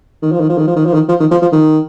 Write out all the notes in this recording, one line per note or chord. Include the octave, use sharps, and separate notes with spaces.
D#3
F3
D#3
F3
D#3
F3
D#3
F3
D#3
F3
D#3
F3
F3
D#3